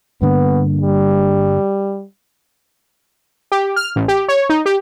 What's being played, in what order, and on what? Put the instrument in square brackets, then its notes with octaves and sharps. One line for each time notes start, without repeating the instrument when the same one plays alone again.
[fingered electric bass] G2 D3 A#3 [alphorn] B3
[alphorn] G3
[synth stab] G4
F6
A1
G4
C#5
D#4
G4